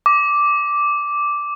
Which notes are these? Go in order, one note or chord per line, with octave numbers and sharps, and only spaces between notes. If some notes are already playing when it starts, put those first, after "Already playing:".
D6